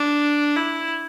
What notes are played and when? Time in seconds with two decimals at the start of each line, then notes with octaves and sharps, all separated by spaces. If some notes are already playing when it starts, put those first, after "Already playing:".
Already playing: D4
0.56 E4